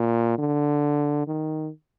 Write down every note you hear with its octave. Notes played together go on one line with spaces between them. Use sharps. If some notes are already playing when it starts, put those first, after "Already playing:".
Already playing: A#2
D3
D#3